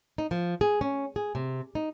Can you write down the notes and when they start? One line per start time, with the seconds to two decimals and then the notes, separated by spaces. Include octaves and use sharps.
0.18 D#4
0.31 F3
0.61 G#4
0.81 C#4
1.16 G#4
1.35 C3
1.75 D#4